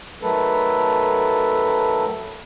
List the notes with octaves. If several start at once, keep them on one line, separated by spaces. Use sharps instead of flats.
D#3 F#3 A3 A4 B4